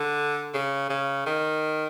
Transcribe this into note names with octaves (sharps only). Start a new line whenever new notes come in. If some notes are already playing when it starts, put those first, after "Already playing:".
Already playing: D3
C#3
C#3
D#3